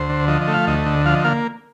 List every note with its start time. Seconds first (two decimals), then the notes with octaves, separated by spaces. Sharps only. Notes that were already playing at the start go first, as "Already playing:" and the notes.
Already playing: D2 C5
0.09 D3
0.28 F3 D#5
0.41 D#5
0.48 A3
0.54 F5
0.67 D2 D#5
0.86 D3
1.06 F3 F5
1.15 D#5
1.24 A#3 F5